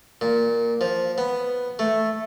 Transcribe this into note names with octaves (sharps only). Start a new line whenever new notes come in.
A#2
F3
B3
A3